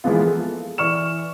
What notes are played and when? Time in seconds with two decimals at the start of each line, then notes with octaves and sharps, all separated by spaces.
0.04 E3 F3 G#3 A#3 B3 F4
0.27 A4
0.78 E3 D5 C#6 F6 E7